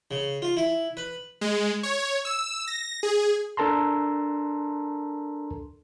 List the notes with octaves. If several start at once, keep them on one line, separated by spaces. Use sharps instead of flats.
C#3
F4
E4
B4
G#3
C#5
E6
A#6
G#4
D4 A4 A#4 A5 A#5 C6